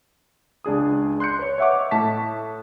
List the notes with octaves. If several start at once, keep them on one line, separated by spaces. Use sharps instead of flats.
C#2 D4 G#4 D#6
C6 F#6 G6 C#7
B4 C#5
C#5 D#5 E5 F#5 C#6 D6
A2 A5 B6